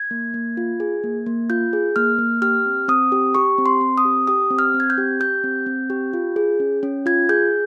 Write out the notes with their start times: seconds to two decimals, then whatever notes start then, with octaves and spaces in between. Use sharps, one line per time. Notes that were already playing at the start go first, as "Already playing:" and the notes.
Already playing: G#6
0.11 A#3
0.34 A#3
0.57 F4
0.80 G#4
1.04 A#3
1.26 A#3
1.50 F4 G6
1.73 G#4
1.96 A#3 F6
2.19 A#3
2.42 G4 F6
2.66 C4
2.88 C4 D#6
3.12 G4
3.35 G4 C#6
3.58 C4
3.66 C6
3.81 C4
3.98 D#6
4.05 G4
4.27 G4 D#6
4.50 C4
4.59 F6
4.74 C4
4.80 G#6
4.90 G6
4.98 G4
5.20 G4 G6
5.44 C4
5.66 C4
5.90 G4
6.13 F4
6.36 G#4
6.60 C#4
6.83 C#4
7.06 F4 G#6
7.29 G#4 G6